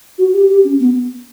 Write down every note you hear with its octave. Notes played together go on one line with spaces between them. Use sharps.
F#4
G4
G4
C#4
B3